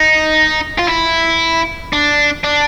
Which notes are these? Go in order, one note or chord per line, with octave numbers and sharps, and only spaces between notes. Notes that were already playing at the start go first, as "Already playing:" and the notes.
Already playing: D#4
F4
E4
D4
D4